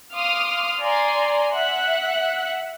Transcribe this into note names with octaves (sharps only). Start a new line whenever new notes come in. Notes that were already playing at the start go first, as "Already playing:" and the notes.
F5 C6 D6 D#6 F6
D5 G#5 A#5 C6
E5 F#5 F#6